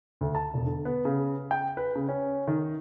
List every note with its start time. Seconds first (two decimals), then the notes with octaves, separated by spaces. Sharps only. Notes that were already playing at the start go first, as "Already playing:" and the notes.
0.21 D2
0.35 A5
0.54 E1
0.66 D3
0.85 B3
1.05 C#3
1.51 G5
1.77 B4
1.95 C#3
2.08 C#4
2.47 D#3